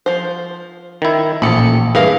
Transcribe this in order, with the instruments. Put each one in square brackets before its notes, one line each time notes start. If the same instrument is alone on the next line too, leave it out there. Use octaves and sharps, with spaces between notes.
[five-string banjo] F3 C5
[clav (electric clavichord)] D#3 E4
[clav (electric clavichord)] A1 [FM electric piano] A#2 C#7 [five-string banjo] F3 A4 B5
[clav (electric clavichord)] G2 E3 [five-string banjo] G#4 A#4 F5